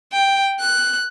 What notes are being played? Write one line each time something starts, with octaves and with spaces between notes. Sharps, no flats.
G5
F#6